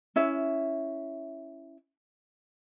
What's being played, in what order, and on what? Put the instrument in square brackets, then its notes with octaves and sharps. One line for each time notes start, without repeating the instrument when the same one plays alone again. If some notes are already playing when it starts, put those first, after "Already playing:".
[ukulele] C#4 E4 E5